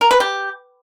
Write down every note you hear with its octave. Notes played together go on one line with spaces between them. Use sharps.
A#4
B4
G4